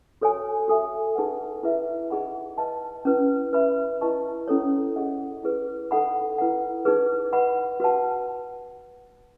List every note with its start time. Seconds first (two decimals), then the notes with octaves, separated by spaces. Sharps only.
0.21 F#4 A4 C#5 G#5
0.68 F#4 A4 E5 G#5
1.15 D#4 G#4 B4 F#5
1.63 E4 G#4 B4 E5
2.10 D#4 G#4 D#5 F#5 B5
2.58 B4 D#5 A5
3.05 C#4 E4 B4
3.53 B4 E5 B5
4.01 E4 B4 D#5 A5 C#6
4.48 C#4 E4 A4 C#5
4.96 G#4 D#5 F#5
5.43 E4 G#4 B4
5.91 D#4 A4 D#5 F#5 B5
6.38 E4 B4 F#5
6.85 D#4 G#4 B4
7.33 B4 D#5 F#5 B5
7.80 F#4 B4 F#5 A5